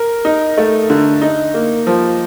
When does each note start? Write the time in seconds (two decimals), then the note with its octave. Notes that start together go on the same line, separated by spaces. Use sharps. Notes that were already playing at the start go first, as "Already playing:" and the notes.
Already playing: A#4
0.25 D#4
0.58 A3
0.90 D3
1.22 D#4
1.54 A#3
1.87 F3